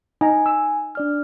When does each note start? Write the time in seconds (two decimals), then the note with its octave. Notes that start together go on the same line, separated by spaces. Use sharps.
0.21 D#4 G#5 A#5
0.46 E6
0.95 D4 D5 F6